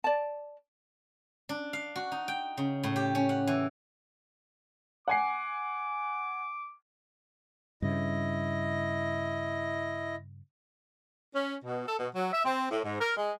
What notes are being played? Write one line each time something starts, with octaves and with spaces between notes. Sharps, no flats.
D5 A5
D4
F5
F#4
D#4
G5
C#3
A2
G4
C#4
F#5
E3
F#5 G#5 D6 C7
G2 C#3 E4 D#5
C#4
B2
A4
B2
F#3
E5
C4
A2
G#2
A#4
G#3